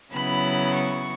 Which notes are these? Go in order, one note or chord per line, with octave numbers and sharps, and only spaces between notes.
C#3 F#3 B3 E4 B5
C#6